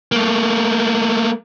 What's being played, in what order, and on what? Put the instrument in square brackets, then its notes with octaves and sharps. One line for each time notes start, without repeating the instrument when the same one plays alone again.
[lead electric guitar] A3 A#3